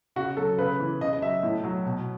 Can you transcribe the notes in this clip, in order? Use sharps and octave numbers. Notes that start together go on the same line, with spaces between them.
C#3 F#4
F#3 A4
C#3 B4
E3
C#3 D#5
D#5
F#3 E5
A2
F#3
B2